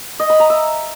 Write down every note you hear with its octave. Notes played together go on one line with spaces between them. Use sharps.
D#5
B5
A#5
E5